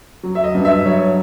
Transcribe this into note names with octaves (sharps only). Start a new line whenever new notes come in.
F#3
E5
D#5
G2
E5
F#3 C#5